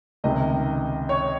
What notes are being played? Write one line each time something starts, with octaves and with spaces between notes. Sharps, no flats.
C#2 C3 D#3 D#5
C#5